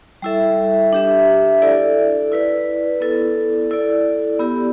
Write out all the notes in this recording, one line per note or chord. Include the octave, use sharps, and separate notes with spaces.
G3 E4 A4 E5
D4 G4 E5
E4 A4 D5
E4 B4 D5
B3 E4 A4 D5
E4 A4 D5
B3 E4 G4